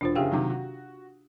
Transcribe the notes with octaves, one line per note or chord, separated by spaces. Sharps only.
E1 D4 F4 C5
F#1 C#3 G4 G#4 F5 G5
C3 D#3 F#3
F#4